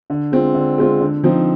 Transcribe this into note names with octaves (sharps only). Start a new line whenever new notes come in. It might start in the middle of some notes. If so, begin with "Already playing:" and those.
D3
G#3 C4 F4
D3
G#3 C4 F4
D3
F3 C4 D#4